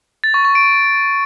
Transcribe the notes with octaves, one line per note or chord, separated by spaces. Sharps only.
A6
C#6
C#6
D7